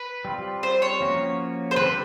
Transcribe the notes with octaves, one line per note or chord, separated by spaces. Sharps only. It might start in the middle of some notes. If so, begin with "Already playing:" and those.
Already playing: B4
G3 C4 F4
C5
C#5
F3 A#3 C#4 F#4
C5
D3 G3 C4 B4